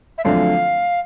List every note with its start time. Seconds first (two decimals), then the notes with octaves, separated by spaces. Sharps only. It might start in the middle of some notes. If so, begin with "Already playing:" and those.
0.18 E5
0.24 F#2 D3 F3 A3 C4 F5